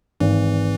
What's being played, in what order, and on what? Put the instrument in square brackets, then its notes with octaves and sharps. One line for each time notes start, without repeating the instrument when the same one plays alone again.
[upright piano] G#1 [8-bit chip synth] E3